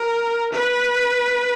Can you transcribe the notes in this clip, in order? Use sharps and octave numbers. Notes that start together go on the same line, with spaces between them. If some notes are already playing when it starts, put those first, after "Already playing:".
Already playing: A#4
B4